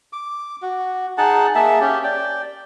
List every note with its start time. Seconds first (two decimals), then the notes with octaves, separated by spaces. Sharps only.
0.13 D6
0.62 F#4
1.18 D#4 G#4 F#5 A5
1.55 A#3 G#4 E5 A5
1.81 C#4 G4
2.04 D5 G5